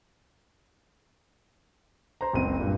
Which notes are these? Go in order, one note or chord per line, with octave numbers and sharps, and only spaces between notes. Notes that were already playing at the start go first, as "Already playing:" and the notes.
C5 A#5
F#1 C#2 C4 D#7
G2 A#2